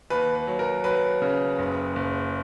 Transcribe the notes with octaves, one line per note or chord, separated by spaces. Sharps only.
D#2 B4
B4
F#3
A#4
F#3 B4
C#3
F#1
F#1